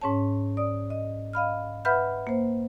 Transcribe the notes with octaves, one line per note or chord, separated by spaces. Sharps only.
G#2 C#4 C#5 A5
D5 D#6
D#5
D#5 F5 B5 F6
B4 E5 F#5 B5 F6 G6
A#3 C5